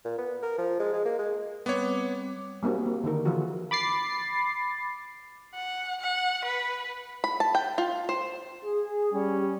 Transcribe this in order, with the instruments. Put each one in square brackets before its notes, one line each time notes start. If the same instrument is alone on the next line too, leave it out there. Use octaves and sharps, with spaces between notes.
[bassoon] A#2
B3
A#4
F3
G#3
G#3
A#3
G#3
[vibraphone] G3 C4 D6 [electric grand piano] B3 C#5
[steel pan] G3 A#3 C4 D4 F#4
A#3
D3 D#3 D#4 A#4
D3 E3 F3 F4 F#4 G#4
[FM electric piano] B5 D6 A6 C7
[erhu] F#5
F#5
B4
[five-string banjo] B5
A5
G5
F4
C5
[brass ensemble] G#4
G3 C#4